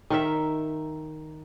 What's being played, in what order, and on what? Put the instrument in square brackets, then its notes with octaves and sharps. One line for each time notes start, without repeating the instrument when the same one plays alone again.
[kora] D#3 A#4 E5